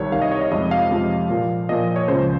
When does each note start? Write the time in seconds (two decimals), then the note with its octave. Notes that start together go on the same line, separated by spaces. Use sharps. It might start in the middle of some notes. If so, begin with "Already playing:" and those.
Already playing: C2 C3 D#3 C#5
0.12 C2 C3 D#3 F5
0.22 D#5
0.32 C#5
0.41 D#5
0.51 F2 C3 F3 G#3 D#5
0.71 F5
0.91 F2 C3 F3 G#3
1.30 A#2 F3 A#3
1.69 A#2 F3 A#3 D#5
1.96 C#5
2.08 C#2 C#3 F3 C5